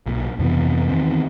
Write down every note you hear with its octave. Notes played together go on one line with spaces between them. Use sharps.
B1 A#2
F2 C3 E3 B3
E2 D#3 B3 C4